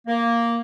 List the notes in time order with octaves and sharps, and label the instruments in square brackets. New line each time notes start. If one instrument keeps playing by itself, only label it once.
[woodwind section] A#3